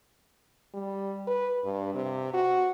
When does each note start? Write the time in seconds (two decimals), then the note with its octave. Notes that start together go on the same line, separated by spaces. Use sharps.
0.73 G3
1.27 B4
1.65 G2
1.94 C3
2.33 F#4